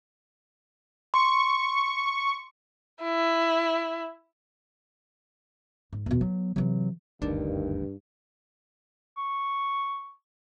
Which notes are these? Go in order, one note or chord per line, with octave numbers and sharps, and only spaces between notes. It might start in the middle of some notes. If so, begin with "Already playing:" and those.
C6 C#6
E4
G#2
E2 B2
F#3 B3
C3 E3 F#3
F#1 D2 G2 D#3 D4
C#6